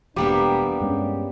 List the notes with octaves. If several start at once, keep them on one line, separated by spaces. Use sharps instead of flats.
E1 G3 A#3 B3 D4 G4
G2 G#3 C#4